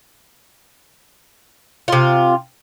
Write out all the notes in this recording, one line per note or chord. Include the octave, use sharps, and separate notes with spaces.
C3 F4